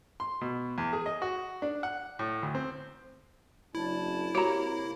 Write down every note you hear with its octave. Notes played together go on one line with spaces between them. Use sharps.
C6
B2
E2
G#4
D#5
F#4
D4
F#5
A2
D2
C4
F#1 D4 E4 A5
C3 A#3 F#4 G4 C#5 A#5